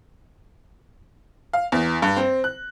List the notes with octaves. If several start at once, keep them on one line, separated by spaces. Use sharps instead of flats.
F5
E2
G2
C4
F#6